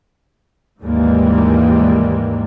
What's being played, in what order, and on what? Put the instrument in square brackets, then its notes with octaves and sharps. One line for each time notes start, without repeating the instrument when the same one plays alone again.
[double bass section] D#2 G#2 E3 G3 G#3 A#3